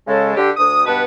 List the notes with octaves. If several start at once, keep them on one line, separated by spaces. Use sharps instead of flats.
C#3 G#3 A4
D3 G4
D2 D#6
G2 B2 B3 B4 F#5 A5